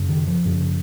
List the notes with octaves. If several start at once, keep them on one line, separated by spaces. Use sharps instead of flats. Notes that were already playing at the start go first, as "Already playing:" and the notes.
Already playing: F#2 C#3
D#3
F3
F#2 C#3